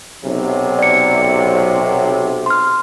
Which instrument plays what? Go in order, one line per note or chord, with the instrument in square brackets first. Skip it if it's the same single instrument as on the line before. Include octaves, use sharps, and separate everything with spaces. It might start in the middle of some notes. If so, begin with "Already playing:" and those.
[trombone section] B1 C3
[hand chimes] D5 C#7
C6 F6